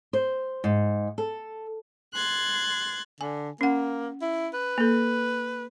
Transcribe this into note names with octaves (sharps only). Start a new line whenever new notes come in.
C5
G#2
A4
C6 F#6 G#6 A6
D3 G#5
A#3 C#4 F#5
E4
B4
A#3 A4